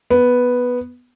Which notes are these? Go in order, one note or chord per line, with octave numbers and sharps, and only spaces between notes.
B3